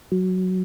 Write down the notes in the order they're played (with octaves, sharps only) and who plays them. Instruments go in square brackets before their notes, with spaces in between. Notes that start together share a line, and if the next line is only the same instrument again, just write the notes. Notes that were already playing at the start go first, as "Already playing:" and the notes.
[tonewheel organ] F#3